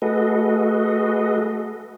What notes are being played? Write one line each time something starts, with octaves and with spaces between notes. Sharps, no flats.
A3 F#4 G#4 A4 B4 D#5